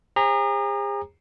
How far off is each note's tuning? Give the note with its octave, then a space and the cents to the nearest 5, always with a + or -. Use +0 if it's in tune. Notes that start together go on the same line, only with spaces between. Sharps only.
G#4 -40 C5 +35 A#5 +0